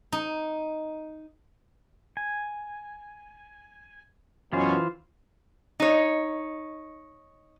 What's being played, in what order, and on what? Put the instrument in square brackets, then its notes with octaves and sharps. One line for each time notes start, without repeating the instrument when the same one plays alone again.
[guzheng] D#4
[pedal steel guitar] G#5
[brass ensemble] F#2 B2 C#4 [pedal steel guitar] E3 F4 C5
[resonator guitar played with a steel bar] D#4 C#5